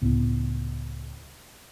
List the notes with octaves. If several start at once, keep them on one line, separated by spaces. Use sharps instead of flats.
C#2 A2 B3